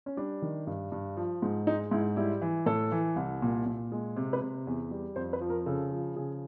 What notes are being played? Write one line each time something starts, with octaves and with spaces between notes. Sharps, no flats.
C#4
G3 D4
D#3
G2
G2
F3
G#2
G#3 D#4
G#2 E4
G3 E4
E3
A2 A4
E3
C2
A#2
A#2
G#3
C3
B4
C3
E2
G3
F2 C5
B4
F3
A#4
C#3 A4
F3
C#3 G#4